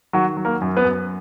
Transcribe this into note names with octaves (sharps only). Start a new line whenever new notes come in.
D#3 F#3 F#4
F#3
A#3 A#4
F#2
B3 B4
F#2